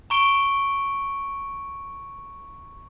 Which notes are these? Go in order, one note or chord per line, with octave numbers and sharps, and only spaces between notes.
A#5 C#6 D7 G7